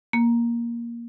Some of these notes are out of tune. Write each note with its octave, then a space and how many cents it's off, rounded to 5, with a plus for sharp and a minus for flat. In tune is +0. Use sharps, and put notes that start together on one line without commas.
A#3 +10